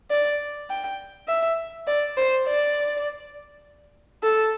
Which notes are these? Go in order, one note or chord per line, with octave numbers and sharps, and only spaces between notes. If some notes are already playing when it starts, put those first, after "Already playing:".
D5
G5
E5
D5
C5
D5
A4